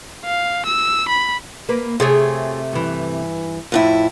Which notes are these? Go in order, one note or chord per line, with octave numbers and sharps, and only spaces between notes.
F5
E6
B5
A#3 B4
C3 A3 F4 G#4 C#5
G2 E3
F2 A2 E4